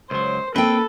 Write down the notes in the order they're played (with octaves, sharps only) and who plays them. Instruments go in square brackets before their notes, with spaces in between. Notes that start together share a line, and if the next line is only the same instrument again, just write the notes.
[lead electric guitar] C#2 F#3 [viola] C5
[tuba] A#3 [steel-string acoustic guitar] C4 G5 [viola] A4 [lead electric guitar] B4